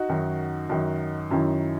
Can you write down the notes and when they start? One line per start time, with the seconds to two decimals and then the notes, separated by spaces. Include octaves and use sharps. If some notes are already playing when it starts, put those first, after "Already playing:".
Already playing: D#4 F#4
0.09 F#2 D#3
0.69 F#2 D#3
1.30 F#2 D#3 C#4 E4